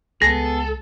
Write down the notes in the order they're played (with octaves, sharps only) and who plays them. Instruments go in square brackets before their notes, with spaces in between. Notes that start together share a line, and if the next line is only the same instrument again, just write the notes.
[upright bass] C#2 [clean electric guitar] B3 G#4 [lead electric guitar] A4 [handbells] A#6